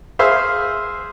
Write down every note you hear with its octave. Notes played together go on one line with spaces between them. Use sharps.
G#4 C5 E5 F5